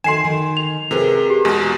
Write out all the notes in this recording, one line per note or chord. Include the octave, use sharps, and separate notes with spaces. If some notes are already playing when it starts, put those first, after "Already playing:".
D2 D#3 G#5 C6 C7 E7
D#3
F7
C3 G#4 A#4 B4
G4
E2 B2 G#3